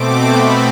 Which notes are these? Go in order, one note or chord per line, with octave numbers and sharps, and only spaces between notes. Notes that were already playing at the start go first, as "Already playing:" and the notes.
Already playing: B2 A3 C4 D6
B5